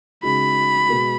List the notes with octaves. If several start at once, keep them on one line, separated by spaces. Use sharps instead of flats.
C#3 G#3 D#4 F#4 B5
B2 G#3 B3 F#4